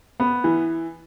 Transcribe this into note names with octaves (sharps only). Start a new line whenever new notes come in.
B3
E3